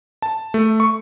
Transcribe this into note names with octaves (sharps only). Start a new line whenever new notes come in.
A5
A3
C#6